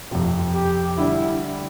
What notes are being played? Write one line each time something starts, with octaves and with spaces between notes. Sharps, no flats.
F2 C3 F3
G4
D3 G3 D4 E4